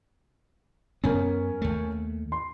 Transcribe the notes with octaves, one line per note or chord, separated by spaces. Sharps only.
F#2 B3 C#4 A#4
D#2 A3
C6